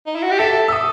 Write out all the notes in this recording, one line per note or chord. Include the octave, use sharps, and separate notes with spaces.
D#4
E4
F#4
G4
A4 E5
E6
D#6